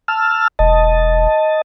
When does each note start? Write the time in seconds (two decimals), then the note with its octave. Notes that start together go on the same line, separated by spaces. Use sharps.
0.08 A5 E6 F6
0.59 E1 D#5 A5